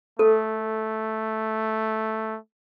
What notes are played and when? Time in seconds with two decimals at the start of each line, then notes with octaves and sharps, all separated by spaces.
0.19 A3 A4